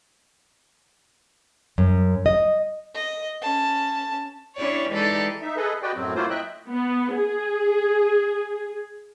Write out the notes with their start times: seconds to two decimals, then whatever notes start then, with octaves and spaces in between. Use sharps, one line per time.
1.78 F#2
2.26 D#5
2.94 D#5
3.42 C#4 A5
4.57 C#4 D4 E4 G4 C#5 D5
4.91 E3 G#3 D#4 G4 A4 D5
5.41 D#4 E5
5.57 G#4 A4 B4 D#5
5.82 F#4 G4 B4 D5 D#5 G5
5.96 F#2 A2 F#3 C4
6.15 F#3 A3 A#3 E4 F4 C5
6.30 D#5 E5 G5 F#6
6.68 B3
7.15 G#4